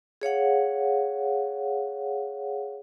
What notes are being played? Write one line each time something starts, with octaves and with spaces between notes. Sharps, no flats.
G#4 C#5 F5 F#5